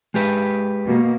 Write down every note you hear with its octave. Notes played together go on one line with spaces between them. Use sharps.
G#3 G4 B4
B2 A#3